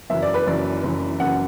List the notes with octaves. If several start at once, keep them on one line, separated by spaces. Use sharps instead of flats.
F#1 F#2 E3 E5
D5
B4
F#1 F#2 E3 D5
F#1 F#2 E3
F#1 F#2 E3 F#5